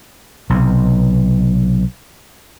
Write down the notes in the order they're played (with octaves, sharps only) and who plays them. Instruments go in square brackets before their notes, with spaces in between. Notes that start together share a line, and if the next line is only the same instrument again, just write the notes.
[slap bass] B1 C3